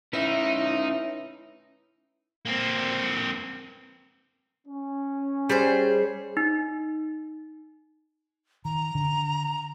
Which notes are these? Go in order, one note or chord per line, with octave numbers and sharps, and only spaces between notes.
C#4 D#4 E4 B4 E5
A#3 C4
C#4
G3 G#4 C5
D#4
D#3 A#5
D3